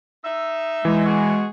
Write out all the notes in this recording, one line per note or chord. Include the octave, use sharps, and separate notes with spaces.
D#4 E5
E3 G#3
B2 F#4 G#4